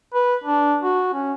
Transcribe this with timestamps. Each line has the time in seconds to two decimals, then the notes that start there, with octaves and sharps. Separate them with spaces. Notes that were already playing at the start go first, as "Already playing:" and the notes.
0.14 B4
0.44 D4
0.83 F#4
1.14 C#4